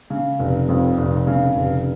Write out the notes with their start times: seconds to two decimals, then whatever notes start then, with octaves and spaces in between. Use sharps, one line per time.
0.10 C#3
0.39 F1
0.68 F2
0.98 F1
1.27 C#3
1.56 F1